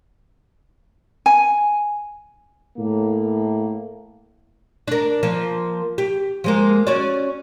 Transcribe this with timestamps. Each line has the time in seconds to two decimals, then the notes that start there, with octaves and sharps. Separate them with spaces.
1.26 G#5
2.78 A2 A#3
4.88 D4 A#4
5.23 F3 A#3
5.98 G4
6.44 F3 G#3 A#3
6.87 C#4 F#4 D5